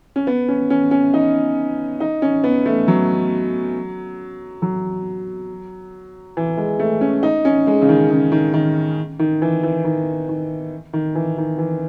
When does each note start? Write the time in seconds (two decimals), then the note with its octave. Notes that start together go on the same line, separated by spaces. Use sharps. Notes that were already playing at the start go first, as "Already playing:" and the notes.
0.16 C#4
0.27 B3
0.48 C#4
0.70 C#4
0.91 C#4
1.14 D#4
2.00 D#4
2.22 C#4
2.44 B3
2.66 A3
2.88 F#3
4.62 F#3
6.37 E3
6.57 G#3
6.80 A3
7.01 C#4
7.23 D#4
7.45 C#4
7.67 G#3
7.82 C#3
7.89 D#3
8.10 C#3
8.32 D#3
8.54 D#3
9.19 D#3
9.42 E3
9.63 E3
9.84 D#3
10.29 D#3
10.93 D#3
11.15 E3
11.38 D#3
11.58 E3